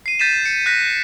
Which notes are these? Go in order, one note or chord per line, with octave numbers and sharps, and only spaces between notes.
C7 D#7
G6 A6 B6 D#7 E7
C#7
F#6 A#6 B6